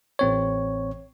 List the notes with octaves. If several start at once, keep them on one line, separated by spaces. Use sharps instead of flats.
A1 C4 C#5